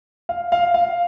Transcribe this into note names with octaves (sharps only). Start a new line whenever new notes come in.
F5
F5
F5